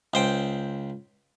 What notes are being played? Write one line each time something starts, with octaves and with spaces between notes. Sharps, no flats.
C#2 C5 G5